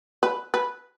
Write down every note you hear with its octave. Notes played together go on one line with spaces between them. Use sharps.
B4
B4